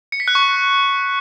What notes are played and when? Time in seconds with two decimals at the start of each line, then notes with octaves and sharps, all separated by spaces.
0.12 C#7
0.20 B6
0.28 F#6
0.35 C#6